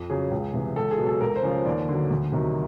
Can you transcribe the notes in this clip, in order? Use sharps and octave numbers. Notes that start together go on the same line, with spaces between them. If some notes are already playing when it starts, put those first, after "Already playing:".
Already playing: F2
C#3 F#3 G#4
C#2
C3 E3
C#2 A4
G#4
B2 F#3
A4
C#2 A#4
C5
C#3 F3
C5
D#2 D5
D3 F#3
D2
C3 D#3 F#3